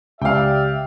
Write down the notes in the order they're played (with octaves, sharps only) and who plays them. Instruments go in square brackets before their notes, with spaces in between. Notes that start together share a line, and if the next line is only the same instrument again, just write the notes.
[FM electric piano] C#2 [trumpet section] G4 D5 E5 [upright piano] F5 G5